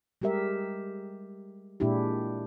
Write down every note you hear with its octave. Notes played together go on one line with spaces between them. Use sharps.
G3 G#3 G4 A#4 E5
A#2 G#3 D4 E4 G4